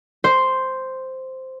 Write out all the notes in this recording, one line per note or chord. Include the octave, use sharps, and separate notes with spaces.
C5